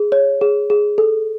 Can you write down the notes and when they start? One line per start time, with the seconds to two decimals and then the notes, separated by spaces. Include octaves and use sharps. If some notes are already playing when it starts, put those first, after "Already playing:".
Already playing: G#4
0.12 C#5
0.41 G#4
0.70 G#4
0.98 A4